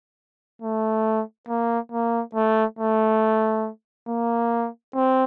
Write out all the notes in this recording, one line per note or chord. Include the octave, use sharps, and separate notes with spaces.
A3
A#3
A#3
A3
A3
A#3
C4